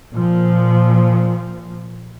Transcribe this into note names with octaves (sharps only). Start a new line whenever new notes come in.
A#2 F3